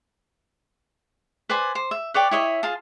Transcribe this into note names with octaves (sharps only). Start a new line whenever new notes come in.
B4 C5 D5 G#5
C5
E5
B4 C#5 D5 G5
E4 C#5 D#5 E5
F4 G#4 A5